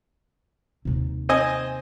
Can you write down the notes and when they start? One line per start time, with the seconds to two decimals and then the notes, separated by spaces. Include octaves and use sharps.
0.85 D#2 C3
1.29 C4 D#5 G#5